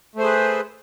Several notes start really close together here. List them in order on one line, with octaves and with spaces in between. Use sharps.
A3 C5 G#4 B4